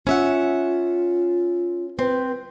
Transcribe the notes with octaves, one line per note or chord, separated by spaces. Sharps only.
C#4 F4 E5 F#5
C4 B4